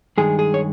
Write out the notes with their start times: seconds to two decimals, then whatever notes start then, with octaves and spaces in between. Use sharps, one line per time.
0.18 G2 D#3 G#3 G#4
0.39 G#4
0.54 C#5